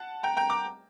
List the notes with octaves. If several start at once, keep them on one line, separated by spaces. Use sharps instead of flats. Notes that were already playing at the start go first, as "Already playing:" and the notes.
Already playing: F#5 A5
G5 A#5
G5 A#5
A#5 D6